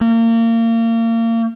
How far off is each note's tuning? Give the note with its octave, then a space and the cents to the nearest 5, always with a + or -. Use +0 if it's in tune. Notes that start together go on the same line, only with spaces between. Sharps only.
A#3 -30